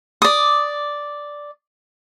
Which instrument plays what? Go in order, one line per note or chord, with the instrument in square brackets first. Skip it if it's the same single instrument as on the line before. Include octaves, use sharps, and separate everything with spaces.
[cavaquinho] D5 D#6